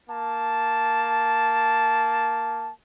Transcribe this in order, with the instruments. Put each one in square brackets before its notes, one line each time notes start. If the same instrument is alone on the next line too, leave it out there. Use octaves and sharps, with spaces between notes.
[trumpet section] A#3 A5